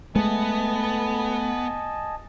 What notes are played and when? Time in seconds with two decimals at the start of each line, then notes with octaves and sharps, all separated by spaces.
0.16 G#3 A3 B3 D#5 G#5 A5